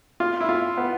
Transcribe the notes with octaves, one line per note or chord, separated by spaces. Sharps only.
F4
E4
F4
B3